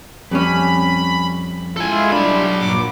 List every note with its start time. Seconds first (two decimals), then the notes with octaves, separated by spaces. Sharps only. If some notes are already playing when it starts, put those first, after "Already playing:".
0.31 F2 G3 C#4 B5
1.77 G#3 E4 F4 A4 G#5
2.12 F#3 G3 D4 B5
2.56 G2 A#2 D6